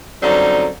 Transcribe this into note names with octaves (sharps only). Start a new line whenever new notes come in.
F#2 D3 G3 C4 D#4